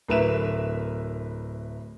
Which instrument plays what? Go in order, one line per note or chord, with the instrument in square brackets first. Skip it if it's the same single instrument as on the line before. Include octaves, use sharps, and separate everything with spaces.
[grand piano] D1 A#4 B4 E5 E7